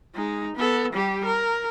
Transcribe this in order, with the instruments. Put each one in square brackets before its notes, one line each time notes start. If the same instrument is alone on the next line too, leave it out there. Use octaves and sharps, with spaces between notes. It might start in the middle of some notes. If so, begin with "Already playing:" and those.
[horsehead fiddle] G#3 D#4
B3 A4
G3 G4
A#4